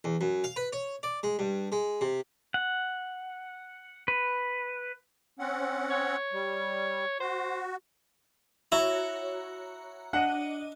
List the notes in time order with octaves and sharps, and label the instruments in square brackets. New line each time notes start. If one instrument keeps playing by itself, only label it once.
[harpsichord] E2
F#2
F5
B4
C#5
D5
G#3
G2
G#3
C3
[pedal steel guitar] F#5
B4
[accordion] C4 C#4 F#5
[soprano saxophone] C#5
[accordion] G3
[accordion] F#4 [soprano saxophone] C5
[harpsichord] E4 [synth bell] F#4 C#5 A#5
[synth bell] D4 D#5 D#7 [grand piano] F#5